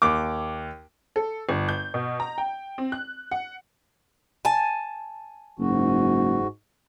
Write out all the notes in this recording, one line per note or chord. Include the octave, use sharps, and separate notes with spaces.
D#2 D6
A4
G1
G6
B2
A#5
G5
C4
F#6
F#5
G#5 A5
F#1 G#2 F#4